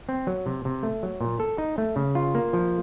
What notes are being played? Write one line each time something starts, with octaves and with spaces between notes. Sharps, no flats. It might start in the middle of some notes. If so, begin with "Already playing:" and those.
C4
F#3
C3
C3
A3
F#3
A#2
A4
D#4
A3
C#3
F4
A#3
F3